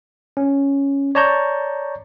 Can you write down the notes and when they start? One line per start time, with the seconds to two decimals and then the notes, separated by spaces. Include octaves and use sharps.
0.37 C#4
1.15 C#5 D5 A5 A#5 C#6 G6